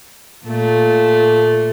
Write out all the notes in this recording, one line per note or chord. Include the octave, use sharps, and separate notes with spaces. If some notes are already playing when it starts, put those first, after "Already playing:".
A#2 A3